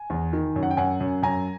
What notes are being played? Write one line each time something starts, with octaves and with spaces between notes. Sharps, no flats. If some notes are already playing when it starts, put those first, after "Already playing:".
Already playing: G#5
E2
D#3
F#2
F#5
G5
F#2 F#5 G#5
F#2
F#2 G#5 A#5